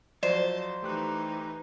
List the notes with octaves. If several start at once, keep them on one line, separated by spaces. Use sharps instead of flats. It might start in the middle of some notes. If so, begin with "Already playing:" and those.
F3 F#3 C5 D5 D#5 A5
E3 A3 D#4 G4 F#6